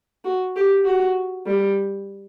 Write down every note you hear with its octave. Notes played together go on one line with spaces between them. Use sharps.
F#4
G4
F#4
G3